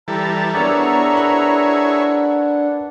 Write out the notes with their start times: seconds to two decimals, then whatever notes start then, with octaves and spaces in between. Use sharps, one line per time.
0.08 E3 G3 A4 A#5
0.55 B3 D4 E4 G#4 A#4 C#5 D5 F#5
1.13 A#4 B4 B5